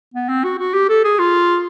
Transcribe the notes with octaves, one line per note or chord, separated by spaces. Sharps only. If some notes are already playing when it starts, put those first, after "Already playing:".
B3
C4
F#4
F#4
G4
A4
G#4
F4